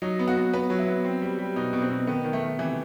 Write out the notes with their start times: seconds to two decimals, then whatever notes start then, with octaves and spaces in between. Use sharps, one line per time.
0.02 F#3 D#4
0.19 B3
0.27 F#4
0.36 B3
0.53 B3 B4
0.70 F#3
0.79 E4
0.87 B3
1.05 C4
1.22 G3
1.39 G3
1.56 B2 D#4
1.73 B2
1.82 C4
1.90 B2
2.07 D#3 B3
2.24 D#3
2.33 A3
2.42 D#3
2.59 C3 E3